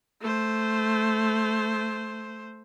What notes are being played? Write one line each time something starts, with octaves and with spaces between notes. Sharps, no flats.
A3 C5